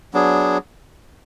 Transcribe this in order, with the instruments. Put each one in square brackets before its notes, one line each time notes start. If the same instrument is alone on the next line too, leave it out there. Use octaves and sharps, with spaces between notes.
[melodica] F#3 B3 D4 G#4